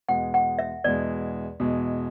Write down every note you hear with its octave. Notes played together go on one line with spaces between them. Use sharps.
E2 B2 G#3 F#5
F#5
E5
E2 B2 G#3 D5
E2 B2 G#3